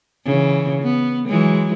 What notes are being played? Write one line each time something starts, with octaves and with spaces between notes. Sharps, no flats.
C#3 E3
B3
E3 F#3 G#3